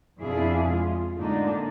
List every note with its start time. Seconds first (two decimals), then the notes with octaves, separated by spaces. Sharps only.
0.20 F2 B2 D4 E4 G#4 F5
0.68 G#3 F4
1.16 A2 D3 G#3 A#3 D4 D#4